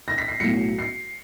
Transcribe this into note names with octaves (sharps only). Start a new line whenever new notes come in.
A#6
B6
C7
B1 A2 F#3 C#7
C7